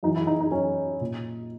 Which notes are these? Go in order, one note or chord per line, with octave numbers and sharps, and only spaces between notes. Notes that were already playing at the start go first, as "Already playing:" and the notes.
F#2 E3 D#4
E4
D#4
D#4
F#2 E3 C#4
A#2